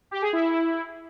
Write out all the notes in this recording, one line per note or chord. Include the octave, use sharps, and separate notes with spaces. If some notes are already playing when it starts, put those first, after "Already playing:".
G4
G#4
E4